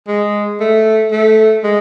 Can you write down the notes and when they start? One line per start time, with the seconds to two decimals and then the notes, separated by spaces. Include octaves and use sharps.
0.08 G#3
0.60 A3
1.12 A3
1.64 G#3